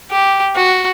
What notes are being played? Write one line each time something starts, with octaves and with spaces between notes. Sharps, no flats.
G4
F#4